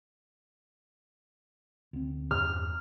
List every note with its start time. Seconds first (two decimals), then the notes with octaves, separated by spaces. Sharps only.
1.93 D2 C4
2.31 E2 G2 F6